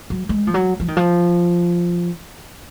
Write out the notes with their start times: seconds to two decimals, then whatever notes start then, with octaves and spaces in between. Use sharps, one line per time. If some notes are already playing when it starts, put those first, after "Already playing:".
0.10 F#3
0.29 G#3
0.47 F3
0.54 F#3
0.80 F3
0.88 D#3
0.97 F3